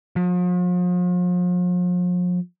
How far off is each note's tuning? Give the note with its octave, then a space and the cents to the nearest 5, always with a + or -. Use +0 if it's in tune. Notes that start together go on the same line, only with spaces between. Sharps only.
F3 +40